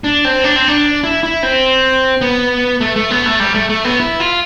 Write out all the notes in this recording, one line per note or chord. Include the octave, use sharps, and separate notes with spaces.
D4
C4
D4
C4
D4
E4
E4
C4
B3
A3
A3
B3
A3
G3
A3
A3
B3
E4
F4